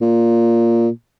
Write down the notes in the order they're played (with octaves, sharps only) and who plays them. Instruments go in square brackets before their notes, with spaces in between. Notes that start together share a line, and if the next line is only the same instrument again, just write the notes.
[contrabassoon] A#2